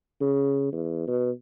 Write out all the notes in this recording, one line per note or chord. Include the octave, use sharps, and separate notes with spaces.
C#3
E2
B2